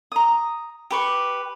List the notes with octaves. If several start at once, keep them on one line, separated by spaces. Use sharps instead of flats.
A#5 D#6
G4 B4 C#6